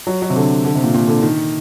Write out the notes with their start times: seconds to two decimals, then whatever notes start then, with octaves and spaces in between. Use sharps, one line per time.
0.07 F#3
0.22 F#3
0.30 C3
0.36 D3
0.65 D3
0.75 C3
0.84 A#2
0.94 A#2
1.08 D3
1.23 D#3